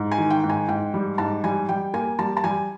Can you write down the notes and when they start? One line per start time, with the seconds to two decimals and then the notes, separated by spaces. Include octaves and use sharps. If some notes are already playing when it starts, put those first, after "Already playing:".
Already playing: G#2
0.12 G#5
0.18 D#3
0.30 G5
0.43 G#2
0.49 G#5
0.68 G#2 G5
0.94 G3
1.18 G#2 A5
1.44 G3 G#5
1.69 G3 G5
1.94 A#3 G#5
2.19 G3 A5
2.37 A5
2.44 G3 G#5